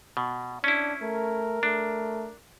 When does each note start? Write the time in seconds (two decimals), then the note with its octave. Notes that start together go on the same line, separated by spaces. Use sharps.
0.17 B2
0.64 C#4 D4 E4
1.02 A3 A#4
1.63 A3 D4